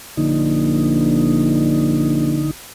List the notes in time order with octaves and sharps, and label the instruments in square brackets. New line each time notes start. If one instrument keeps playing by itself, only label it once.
[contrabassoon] A#1 [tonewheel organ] D3 D#4